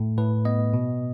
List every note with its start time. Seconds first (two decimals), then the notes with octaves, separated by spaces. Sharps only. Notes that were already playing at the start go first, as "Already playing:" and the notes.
Already playing: A2 A3
0.18 A2 B4
0.45 B3 D#5
0.73 B2